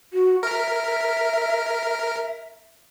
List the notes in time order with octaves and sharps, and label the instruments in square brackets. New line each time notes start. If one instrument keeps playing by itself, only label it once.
[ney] F#4
[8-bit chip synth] A#4 [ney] E5